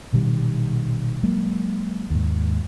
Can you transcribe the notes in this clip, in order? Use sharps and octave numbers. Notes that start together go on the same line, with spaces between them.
A#1 B2 D#3 G3
F#3 G#3 A#3
D#2 G#2